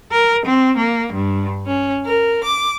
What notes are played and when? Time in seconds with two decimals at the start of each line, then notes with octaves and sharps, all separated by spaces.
0.12 A#4
0.46 C4
0.77 A#3
1.14 G2
1.66 C#4
2.05 A#4
2.44 D6